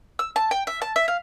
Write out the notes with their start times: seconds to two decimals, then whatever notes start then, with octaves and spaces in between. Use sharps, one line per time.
0.19 E6
0.36 A5
0.51 G5
0.67 E5
0.82 A5
0.96 E5
1.08 F5